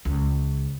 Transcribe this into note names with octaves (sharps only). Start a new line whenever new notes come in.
C#2